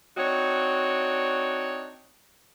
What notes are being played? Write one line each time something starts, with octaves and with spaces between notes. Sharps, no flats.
C4 D4 D#4 F#4 C#5